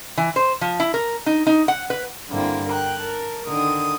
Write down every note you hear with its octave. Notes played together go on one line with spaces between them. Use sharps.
E3
C5
F3
E4
A#4
D#4
D#4
F#5
B4
G2 D3 A#3 C4 E4
A#4 G5 F#6
A#4 A5
D3 D#3 D#6